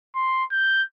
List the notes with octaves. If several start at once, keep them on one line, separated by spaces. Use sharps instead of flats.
C6
G6